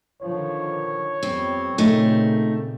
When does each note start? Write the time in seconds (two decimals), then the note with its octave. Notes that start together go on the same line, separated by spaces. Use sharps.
0.22 D3 D#3 F3 C#5
1.23 F2 G3 B3 C4
1.78 A#2 C#3 A3 C4 D#4